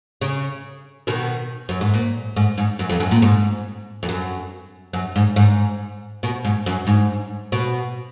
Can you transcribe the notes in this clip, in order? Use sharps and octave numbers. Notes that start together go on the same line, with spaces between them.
C#3
B2 D#3
F#2
G#2
A#2
G#2
G#2
F#2
F2
F#2
A#2
G#2
F2
F#2
F#2
G#2
G#2
B2
G#2
F#2
G#2
B2